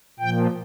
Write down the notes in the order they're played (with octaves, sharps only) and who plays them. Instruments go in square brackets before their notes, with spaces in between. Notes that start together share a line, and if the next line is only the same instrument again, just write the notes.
[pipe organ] A#2 F3 G5